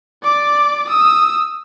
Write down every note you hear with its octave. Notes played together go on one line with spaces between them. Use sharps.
D5 D6
D#6 E6